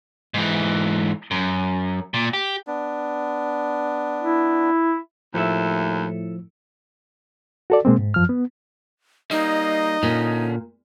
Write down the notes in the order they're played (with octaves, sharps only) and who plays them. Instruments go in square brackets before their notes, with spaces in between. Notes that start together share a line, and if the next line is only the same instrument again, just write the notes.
[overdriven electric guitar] G#2 E3
F#2
A#2
G4
[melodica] B3 D4
[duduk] E4
[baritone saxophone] D#2 [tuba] A2 [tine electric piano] F3 [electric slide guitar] E4 A4 E5
[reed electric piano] F#4 A4 D5
B2 G#3 A#3 C4
G#2
F#2 F3 F6
B3
[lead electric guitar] G3 A#3 [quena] D#4 [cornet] D#5
[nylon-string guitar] A#2 [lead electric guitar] D3 C#4